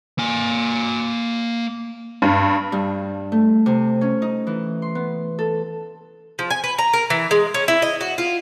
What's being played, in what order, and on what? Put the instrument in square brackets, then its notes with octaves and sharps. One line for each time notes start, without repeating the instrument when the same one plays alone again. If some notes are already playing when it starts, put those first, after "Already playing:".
[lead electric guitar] A#3 G#5
[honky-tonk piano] G2
[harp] G2
A3
C3
C#4
D#4
E3
C6
B3
A4
[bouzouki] F3
G#5
B4
A#5
A#4
E3
G#3
C#4
E4
D#5
F#4
F4